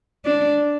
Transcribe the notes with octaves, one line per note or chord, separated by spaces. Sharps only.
D4